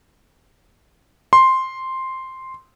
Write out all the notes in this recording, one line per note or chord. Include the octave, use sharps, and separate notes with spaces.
C6